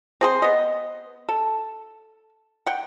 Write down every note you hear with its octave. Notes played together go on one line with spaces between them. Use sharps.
C4 G#4 C5
B3 D#5
A4
F#5 G5